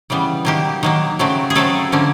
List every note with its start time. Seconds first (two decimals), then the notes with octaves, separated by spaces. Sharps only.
0.10 C#3 E3 G3 B3
0.45 D#3 F#3 A#3 G4
0.83 D#3 F#3 A#3
1.19 C#3 F#3 A3 C4
1.50 G#4
1.55 C#3 F#3 A3 C4 A4
1.92 D3 F3 A#3 C#4